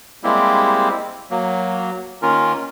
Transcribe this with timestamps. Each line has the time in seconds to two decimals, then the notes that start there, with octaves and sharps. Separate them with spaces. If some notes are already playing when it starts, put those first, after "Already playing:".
0.24 G3 G#3 A#3 C4 E4 G4
1.31 F#3 A#3
2.22 D#3 A#3 C#4 F4 A#4